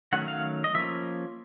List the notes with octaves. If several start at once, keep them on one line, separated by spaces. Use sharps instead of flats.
D#3 F#3 A3 C#4 F#5
F5
D#5
F3 A#3 C#4 E5